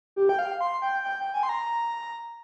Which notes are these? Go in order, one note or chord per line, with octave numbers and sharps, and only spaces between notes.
G4
G5
F5
C6
G5
G5
G5
G#5
C6
A#5